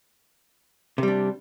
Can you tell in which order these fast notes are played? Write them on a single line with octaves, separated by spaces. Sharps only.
C3 G3 D4